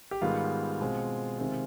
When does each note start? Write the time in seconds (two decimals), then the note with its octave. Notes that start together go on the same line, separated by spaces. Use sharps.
0.11 G4
0.21 G#2 D#3 G3 B3 F4
0.80 B2 G#3 C4
1.39 C3 D#3 G#3 C4